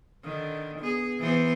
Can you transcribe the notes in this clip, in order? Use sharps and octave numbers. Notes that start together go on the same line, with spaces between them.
D3 D#3
B3 G#4
E3 B3 C5